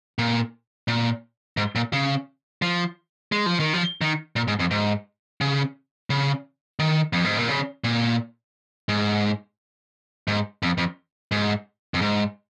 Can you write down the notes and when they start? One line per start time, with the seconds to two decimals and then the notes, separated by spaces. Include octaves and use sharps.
0.19 A#2
0.88 A#2
1.57 G#2
1.75 A#2
1.93 C#3
2.62 F3
3.32 G#3
3.46 F3
3.60 D#3
3.73 F3
4.01 D#3
4.36 A#2
4.48 G#2
4.59 F2
4.71 G#2
5.41 C#3
6.10 C#3
6.79 D#3
7.13 F2
7.25 G#2
7.37 A#2
7.49 C#3
7.84 A#2
8.89 G#2
10.28 G#2
10.62 F2
10.78 F2
11.32 G#2
11.94 F2
12.01 G#2